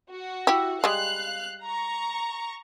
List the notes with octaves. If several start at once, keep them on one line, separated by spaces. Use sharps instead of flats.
F#4
E4 G4
G3 G#3 F5 F#6
A#5 C#6